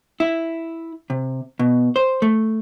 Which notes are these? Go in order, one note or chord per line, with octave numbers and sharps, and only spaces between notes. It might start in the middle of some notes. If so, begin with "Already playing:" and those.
E4
C3
B2
C5
A3